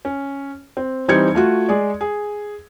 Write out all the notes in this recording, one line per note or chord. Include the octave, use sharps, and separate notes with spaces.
C#4
C4
E3 G3 C4 D#4 G#6 C#7
A3 F4 F#4
G#3 G#4 D5
G#4